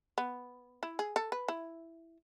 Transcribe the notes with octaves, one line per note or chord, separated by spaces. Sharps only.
B3
E4
G#4
A4
B4
E4